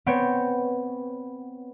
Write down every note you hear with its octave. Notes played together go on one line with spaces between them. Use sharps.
B3 C4 C#5 G6 D7